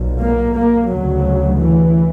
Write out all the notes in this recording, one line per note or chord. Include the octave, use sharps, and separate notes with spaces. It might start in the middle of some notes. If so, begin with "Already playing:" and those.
Already playing: B1 A#2
A#3
A#3
D2 C#3 F#3
E3